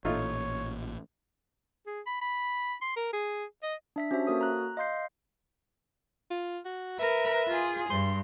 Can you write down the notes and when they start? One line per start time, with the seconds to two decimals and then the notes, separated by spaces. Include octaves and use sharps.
0.05 A1 A#2 A3 D#4 F4 C#5
1.87 G#4
2.07 B5
2.22 B5
2.82 C6
2.97 A#4
3.13 G#4
3.63 D#5
3.96 D4 E5 B6
4.11 C#4 F#4 G4 C5 E5 A5
4.27 A#3 F#4 A4 A#4 C#5 D#6
4.41 A#5 F#6
4.77 D#5 F5 C6 G6 C7
6.31 F4
6.65 F#4
6.99 A#4 B4 E5
7.48 F4 G#4
7.90 G2 C6